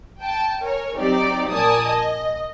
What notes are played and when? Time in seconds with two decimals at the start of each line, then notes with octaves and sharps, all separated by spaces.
0.20 G5 A5
0.61 A#4 C#5 G#5
0.95 F#3 C4 D#4 G4 D5
1.51 A#1 A#4 D5 G#5 A5 D#6
1.87 D#5